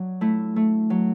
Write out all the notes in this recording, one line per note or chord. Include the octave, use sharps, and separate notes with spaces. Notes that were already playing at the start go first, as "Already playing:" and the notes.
Already playing: F#3 D4
A3 E4
A3
F#3